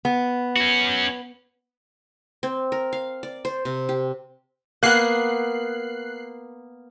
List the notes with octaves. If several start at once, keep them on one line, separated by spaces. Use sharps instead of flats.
B3
C#4 F#4
C4
A#4
F5
D5
C5
C3
G4
A#3 B3 F#6 C7